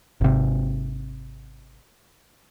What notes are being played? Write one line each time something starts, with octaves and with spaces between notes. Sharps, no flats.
G#1 C3